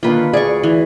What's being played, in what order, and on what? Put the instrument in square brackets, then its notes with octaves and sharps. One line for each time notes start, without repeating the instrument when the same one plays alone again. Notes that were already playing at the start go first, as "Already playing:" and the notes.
[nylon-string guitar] D3 D#3 A#3 [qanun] F4 B4
[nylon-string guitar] D2 D5 [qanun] G#4 C#6
[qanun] E3